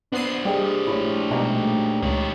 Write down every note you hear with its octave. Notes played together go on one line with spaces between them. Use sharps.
B3 D4 C5 C7 D#7
G3 G4 G#4 D#5
A#1 A3 E4 C#5
B2 G3 G#3 D#4 A#5
C#2 D#3 C#5